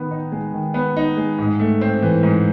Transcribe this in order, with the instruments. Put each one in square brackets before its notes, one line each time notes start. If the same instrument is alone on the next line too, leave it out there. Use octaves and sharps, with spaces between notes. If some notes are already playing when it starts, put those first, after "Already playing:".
Already playing: [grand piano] D#3 B3
D#4
G#3
D#3
B3
D#4
G#3
G#2
A3
C4
E3
G#2